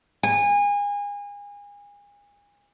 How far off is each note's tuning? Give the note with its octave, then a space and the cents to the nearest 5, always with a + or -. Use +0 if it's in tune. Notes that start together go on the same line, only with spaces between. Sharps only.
G#5 -30